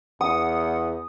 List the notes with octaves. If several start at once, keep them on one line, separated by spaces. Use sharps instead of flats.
E2 F#5 D#6